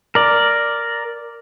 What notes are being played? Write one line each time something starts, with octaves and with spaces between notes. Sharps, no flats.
A#4 D5